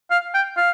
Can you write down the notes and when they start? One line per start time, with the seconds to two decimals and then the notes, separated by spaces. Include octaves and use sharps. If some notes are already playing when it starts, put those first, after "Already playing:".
0.11 F5
0.34 G5
0.57 F5